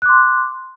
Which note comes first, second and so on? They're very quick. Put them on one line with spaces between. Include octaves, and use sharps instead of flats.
F#6 D6 C6